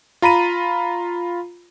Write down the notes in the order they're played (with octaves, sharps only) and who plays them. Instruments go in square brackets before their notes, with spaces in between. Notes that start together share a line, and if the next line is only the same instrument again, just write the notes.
[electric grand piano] F4 A#5 B5 D#7